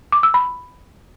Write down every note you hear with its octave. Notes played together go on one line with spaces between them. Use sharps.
D6
E6
B5